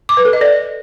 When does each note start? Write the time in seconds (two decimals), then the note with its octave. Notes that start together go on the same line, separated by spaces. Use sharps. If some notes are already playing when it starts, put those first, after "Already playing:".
0.09 D6
0.17 B4
0.25 A4
0.33 D#5
0.41 D5